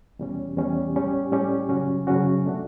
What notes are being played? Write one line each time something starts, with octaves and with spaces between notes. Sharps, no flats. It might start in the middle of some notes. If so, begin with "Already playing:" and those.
E2 B2 G3 C#4
E2 B2 G3 C#4
A2 G3 C#4 G4
A2 G3 C#4 G4
F#2 C#3 F#3 C#4 F#4
F#2 C#3 F#3 C#4 F#4
B2 A3 D4 F#4